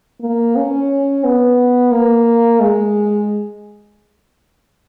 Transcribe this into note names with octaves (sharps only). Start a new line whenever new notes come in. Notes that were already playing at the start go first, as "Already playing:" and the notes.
A#3
C#4
B3
A#3
G#3